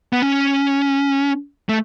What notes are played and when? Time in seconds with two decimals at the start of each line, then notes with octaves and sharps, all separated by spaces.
0.13 B3
0.22 C#4
1.69 A3